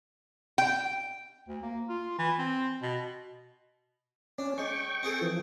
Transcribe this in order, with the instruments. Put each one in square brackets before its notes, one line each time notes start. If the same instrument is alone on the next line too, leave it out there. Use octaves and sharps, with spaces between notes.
[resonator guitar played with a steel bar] G5
[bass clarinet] D2
A#3
F4
E3
C4
B2
[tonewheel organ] C#4 [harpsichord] D4
[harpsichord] G#3 [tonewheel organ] G5 C#6
[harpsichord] C4 G#4 A4
[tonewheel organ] E3 F3